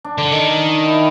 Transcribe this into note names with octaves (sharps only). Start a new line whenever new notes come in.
D4
D3
D#3
E4